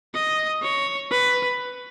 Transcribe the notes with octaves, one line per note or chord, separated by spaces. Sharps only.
D#5
C#5
B4